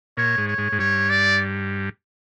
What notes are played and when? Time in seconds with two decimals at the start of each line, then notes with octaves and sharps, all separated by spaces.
0.17 A#2 C#5
0.38 G#2
0.47 C#5
0.58 G#2
0.72 G#2
0.78 G2 C#5
1.10 D5